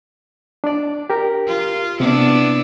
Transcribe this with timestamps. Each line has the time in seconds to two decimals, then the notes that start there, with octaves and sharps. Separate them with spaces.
0.64 D4 D5
1.10 G4 A#4
1.47 F4
2.00 C3 B3 D4 E4